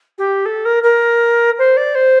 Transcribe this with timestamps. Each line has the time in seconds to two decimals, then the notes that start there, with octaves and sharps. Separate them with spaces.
0.18 G4
0.45 A4
0.65 A#4
0.83 A#4
1.58 C5
1.77 D5
1.95 C5